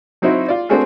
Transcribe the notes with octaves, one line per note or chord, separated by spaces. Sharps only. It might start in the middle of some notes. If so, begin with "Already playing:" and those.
F#3 C4 D#4 E4 F#4
F4 D5
A3 C4 D4 F#4 G#4 A#4